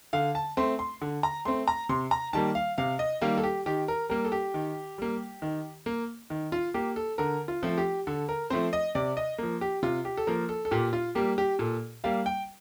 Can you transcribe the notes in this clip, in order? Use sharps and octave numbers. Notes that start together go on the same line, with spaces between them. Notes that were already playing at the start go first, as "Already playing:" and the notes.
D3 F5
A5
A3 C4 C6
C6
D3
A#5
A3 C4 C6
A#5
C3 C6
A#5
D#3 G3 A#3 A5
F5
C3 F5
D#5
D#3 G3 A#3 F5
A4
G4
D#3 G4
A#4
G3 A#3 A#4
A4
G4
D#3
G3 A#3
D#3
A#3
D#3
F4
A#3 G4
A4
D3 A#4
F4
F3 A3 C4
G4
D3 A4
A#4
F3 A3 C4 C5
D#5
C3 D5
D#5
F3 A#3
G4
C3 F4
G4
A4
F3 A#3 A#4
A4
A4
A#2 G4
F4
G3 A#3 G4
G4
A#2 A4
G3 A#3 F5
G5